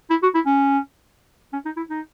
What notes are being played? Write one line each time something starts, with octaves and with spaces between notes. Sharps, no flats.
E4
F#4
E4
C#4
C#4
D#4
E4
D#4